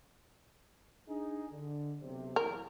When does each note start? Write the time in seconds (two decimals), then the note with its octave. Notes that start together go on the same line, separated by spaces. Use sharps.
1.08 D4 D#4 G#4
1.51 D3
2.00 B1 C3
2.36 F#1 B2 E3 A#4